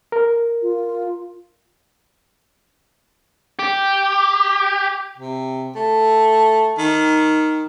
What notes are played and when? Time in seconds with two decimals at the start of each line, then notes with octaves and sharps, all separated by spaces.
0.12 A#4
0.62 F4
3.59 G4
5.18 C3
5.75 A3
6.78 D#3